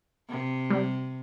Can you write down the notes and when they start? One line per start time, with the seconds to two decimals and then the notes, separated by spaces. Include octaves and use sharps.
0.29 C3
0.70 G3